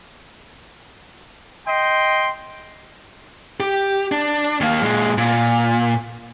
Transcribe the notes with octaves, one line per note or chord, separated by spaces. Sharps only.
D#5 G5 C6
G4
D4
D#2 A#3
A#2 G#3
A#2